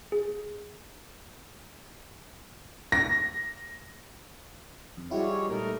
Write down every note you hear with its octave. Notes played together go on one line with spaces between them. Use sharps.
G#4
A#6
F2
G3 G#3 E4 F#4 G4 C#5
F4
A#2 G3 A3 D#4 A#4